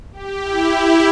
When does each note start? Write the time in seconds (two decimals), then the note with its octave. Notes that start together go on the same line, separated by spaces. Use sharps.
0.12 G4
0.42 E4